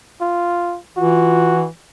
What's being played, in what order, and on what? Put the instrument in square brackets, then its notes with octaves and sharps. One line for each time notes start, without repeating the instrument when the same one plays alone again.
[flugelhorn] F4
[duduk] E3 [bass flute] F4 [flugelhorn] F#4